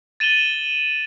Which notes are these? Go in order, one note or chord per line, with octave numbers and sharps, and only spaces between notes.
A6 D#7 E7 F#7 G7